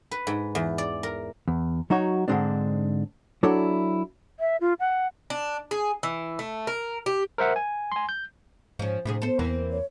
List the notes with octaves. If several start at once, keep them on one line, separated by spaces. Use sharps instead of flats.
B4
G#2
E2
D5
A#4
E2
F#3 D#4 F#4 C#5
G#2 D3 E3 G#3 C4 D4
F#3 D4 E4 A4 C#5 D5
E5
F4
F#5
D4
G#4
E3
A3
A#4
G4
A#4 C5 E5 F#5
G#5
G#5 C6
G6
G#2 F3 C#4
D2 A2 C3 G#4
B3 A4 C5
E2 E3 A#3 C4
C#5